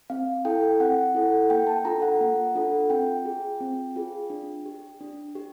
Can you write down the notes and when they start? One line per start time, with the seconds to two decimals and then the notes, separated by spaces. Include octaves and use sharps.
0.10 C4 F5
0.45 E4 A4 G5
0.80 C4 F#5
1.15 E4 A4
1.50 A#3 G5
1.67 A5
1.84 D4 F4 A4 A#5
2.02 F#5
2.21 A#3
2.55 D4 F4 A4
2.90 C4 G5
3.25 F4 G#4
3.60 C4
3.96 F4 G#4
4.30 D4
4.66 G4
5.01 D4
5.35 G4